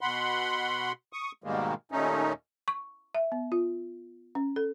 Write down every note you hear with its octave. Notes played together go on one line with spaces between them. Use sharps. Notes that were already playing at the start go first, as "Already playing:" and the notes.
B2 F#5 B5 C6
C#6 D#6
G#2 B2 D#3 G3 G#3 A#3
D#2 A#2 A3 C#4 D#4
C#6
E5
B3
F4
C#4
A4